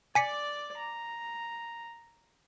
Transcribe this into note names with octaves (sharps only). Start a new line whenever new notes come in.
D5 G#5 D6 B6 C#7
A#5